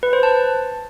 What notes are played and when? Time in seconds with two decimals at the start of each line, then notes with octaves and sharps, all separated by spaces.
0.03 B4
0.13 C5
0.23 A5